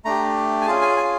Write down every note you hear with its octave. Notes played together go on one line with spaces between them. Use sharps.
A3 D4 G4 A#5
G#5
C#4 F4 G#4 A5
G#5
G#5